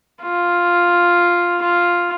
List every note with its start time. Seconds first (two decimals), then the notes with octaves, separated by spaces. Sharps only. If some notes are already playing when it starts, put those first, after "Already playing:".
0.23 F4
1.63 F4